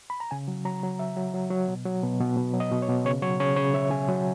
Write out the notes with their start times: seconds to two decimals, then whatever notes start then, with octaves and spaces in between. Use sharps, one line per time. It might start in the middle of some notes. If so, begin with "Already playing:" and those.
0.10 B5
0.20 A#5
0.31 C#3 G#5
0.48 F#3
0.65 F#3 A#5
0.83 F#3
0.99 F#3 E5
1.17 F#3
1.34 F#3
1.51 F#3
1.68 B2
1.85 F#3
2.03 B2
2.20 B2
2.36 B2
2.53 F#3
2.60 D#5
2.72 B2
2.82 C#5
2.89 B2
3.05 C#3 C#5
3.22 F#3 C#5
3.40 C#3 C#5
3.56 C#3 C#5
3.74 C#3 E5
3.90 C#3 G#5
4.09 F#3